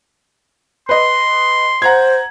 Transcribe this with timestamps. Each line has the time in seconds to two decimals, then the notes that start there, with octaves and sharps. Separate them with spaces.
0.89 B4 D#5 C6
1.82 C5 F#5 A#5 G#6